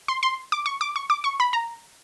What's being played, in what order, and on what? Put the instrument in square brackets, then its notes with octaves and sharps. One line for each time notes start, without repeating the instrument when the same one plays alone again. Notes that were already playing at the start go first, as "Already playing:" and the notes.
[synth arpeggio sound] C6
C6
D6
C#6
D6
C#6
D6
C#6
B5
A#5